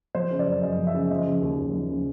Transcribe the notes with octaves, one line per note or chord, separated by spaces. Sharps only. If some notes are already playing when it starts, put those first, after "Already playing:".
F3 C5
C#3
D5
F#2
F#2 D#5
F3
E5
C#3
F3 D#5
C#3
D#2
D#2
F3
C#3